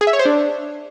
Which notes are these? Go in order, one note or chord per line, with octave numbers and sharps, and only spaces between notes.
G#4
E5
C#5
C5
D4